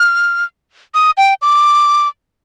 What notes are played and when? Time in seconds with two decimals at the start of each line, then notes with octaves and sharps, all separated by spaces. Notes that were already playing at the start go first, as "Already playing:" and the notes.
Already playing: F6
0.94 D#6
1.17 G5
1.42 D6